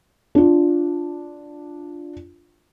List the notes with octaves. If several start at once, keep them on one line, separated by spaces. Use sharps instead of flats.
D4 F4